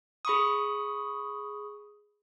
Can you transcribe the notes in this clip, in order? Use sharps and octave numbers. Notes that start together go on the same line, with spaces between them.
G#4 B5 C#6 D#6